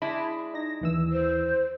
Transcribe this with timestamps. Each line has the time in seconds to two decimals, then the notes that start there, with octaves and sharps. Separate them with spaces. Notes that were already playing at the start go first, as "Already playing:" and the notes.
0.02 G#3 D4 E4 B5
0.54 D#4 A#6
0.81 D#2 E3 E6
1.12 C5